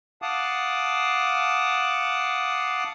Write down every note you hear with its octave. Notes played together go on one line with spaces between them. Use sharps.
F5 F#5 A5 D6 D#6